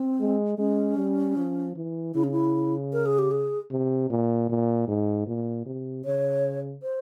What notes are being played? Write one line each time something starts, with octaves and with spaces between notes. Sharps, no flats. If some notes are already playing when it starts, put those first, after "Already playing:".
Already playing: C4
G#3
G#3 C#4
G3
F3
E3
C#3 E4
C#4
E4
A#4
G#4
G4
G#4
C3
A#2
A#2
G#2
A#2
C3
C#3 C#5
C5